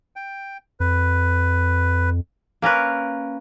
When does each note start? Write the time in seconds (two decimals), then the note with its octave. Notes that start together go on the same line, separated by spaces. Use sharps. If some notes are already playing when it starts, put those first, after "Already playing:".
0.16 G5
0.80 F2 B4
2.62 A#3 C#4 A#4 B4